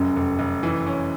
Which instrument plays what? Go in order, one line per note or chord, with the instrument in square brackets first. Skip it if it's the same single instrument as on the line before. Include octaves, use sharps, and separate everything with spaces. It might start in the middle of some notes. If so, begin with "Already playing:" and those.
Already playing: [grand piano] F1 [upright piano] F#2
[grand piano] F1
F1
E3
C#4